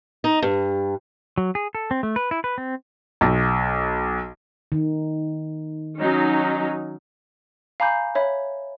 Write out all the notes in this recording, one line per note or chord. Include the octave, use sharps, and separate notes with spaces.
D#4
G2
F#3
G#4
A4
C4
A3
B4
E4
B4
C4
B1
D#3
F#3 C#4 D#4
F5 G#5 A#5 B5 D6 G6
C#5 E5 B5